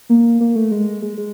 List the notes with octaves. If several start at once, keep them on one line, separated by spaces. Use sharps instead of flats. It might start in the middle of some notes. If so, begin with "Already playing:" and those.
A#3
A#3
A3
G#3
G#3
G#3